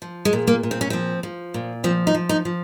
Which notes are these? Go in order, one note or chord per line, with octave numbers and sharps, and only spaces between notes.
F3
G#3
A#2
A#3
A#2
C4
C#4
F3 C4
F3
A#2
F3 C4
D#4
F3
D#4
F3